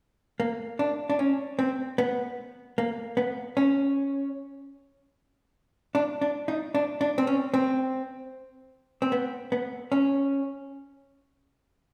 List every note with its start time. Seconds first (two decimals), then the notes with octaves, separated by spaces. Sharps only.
0.40 A#3
0.79 D4
1.10 D4
1.19 C#4
1.59 C4
1.98 B3
2.78 A#3
3.17 B3
3.57 C#4
5.95 D4
6.21 D4
6.48 D#4
6.75 D4
7.01 D4
7.18 C4
7.27 C#4
7.54 C4
9.02 C4
9.12 B3
9.52 B3
9.92 C#4